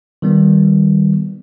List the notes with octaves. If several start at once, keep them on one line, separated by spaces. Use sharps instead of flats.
D#3 G3 B3